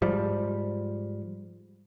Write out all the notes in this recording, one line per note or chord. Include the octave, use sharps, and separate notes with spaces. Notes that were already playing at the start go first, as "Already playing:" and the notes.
G#2 F3 G3